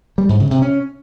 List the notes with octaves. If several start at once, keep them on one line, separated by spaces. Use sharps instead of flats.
G3
G#2
C#3
C3
C#4